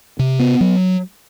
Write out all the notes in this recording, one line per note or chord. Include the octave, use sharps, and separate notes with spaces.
C3
B3
F#3